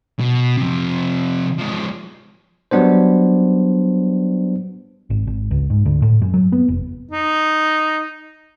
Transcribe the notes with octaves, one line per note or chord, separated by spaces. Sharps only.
B2
C3 F3
F3 G#3
F#3 G3 B3 D4 C5
G#1
G#1
C#2
G#2
D2
A2
F#2
F#3
B3
F1
D#4